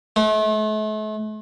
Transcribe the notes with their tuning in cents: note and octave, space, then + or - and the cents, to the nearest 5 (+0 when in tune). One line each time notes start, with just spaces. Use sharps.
A3 -40